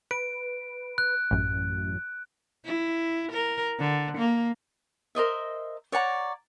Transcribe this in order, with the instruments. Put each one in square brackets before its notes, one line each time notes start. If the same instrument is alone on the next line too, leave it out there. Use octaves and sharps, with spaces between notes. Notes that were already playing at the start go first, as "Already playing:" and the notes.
[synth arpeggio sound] B4 [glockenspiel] D7
[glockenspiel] F#6
[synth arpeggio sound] A1 F#2
[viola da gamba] E4
A#4
D3
A#3
[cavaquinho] A#4 C5 D#5 E5
C#5 D5 F#5 A#5